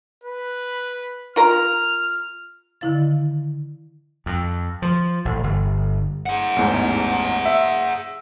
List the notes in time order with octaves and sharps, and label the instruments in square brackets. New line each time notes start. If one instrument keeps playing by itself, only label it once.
[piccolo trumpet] B4
[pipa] F4 A#4 A#5 [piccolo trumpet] F6
[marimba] D3 D#3 E4 F5 A6
[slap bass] F2
F3
A1
G1
[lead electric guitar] G#4 F#5
[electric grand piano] A1 E2 G#2
E5